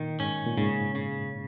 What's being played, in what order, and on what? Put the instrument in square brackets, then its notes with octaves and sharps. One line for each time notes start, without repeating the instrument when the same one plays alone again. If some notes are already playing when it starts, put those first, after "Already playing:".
Already playing: [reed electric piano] A#2 [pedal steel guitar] D#3
[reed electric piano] G#2 [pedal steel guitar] C#4
[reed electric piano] A#2
[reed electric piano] G#2 [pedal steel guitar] C#3
[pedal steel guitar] C#3